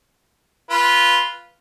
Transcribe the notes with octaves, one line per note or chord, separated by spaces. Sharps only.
F4 B4